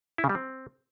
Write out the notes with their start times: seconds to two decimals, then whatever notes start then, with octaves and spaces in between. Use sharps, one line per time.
0.18 E4
0.24 C#3
0.29 G3
0.35 C4